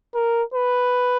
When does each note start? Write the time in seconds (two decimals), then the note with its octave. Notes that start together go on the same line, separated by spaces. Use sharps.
0.15 A#4
0.54 B4